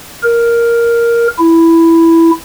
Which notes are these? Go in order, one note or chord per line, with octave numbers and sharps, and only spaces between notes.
A#4
E4